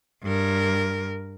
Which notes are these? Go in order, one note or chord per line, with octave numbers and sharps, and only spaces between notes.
G2 A#4